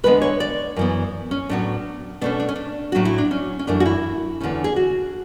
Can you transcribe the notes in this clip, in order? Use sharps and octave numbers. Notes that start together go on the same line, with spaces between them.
E2 D3 G#3 B3 B4
C#5
D5
F#2 E3 B3
C#4
A2 F#3 B3 D4
B2 A3 C#4 D4
D4
C#4
D4
A2 F#3 C#4 F#4
E4
D4
C#4
C#4
F#2 E3 A3 D4
F#4
E4
E2 D3 A3 C#4
G#4
F#4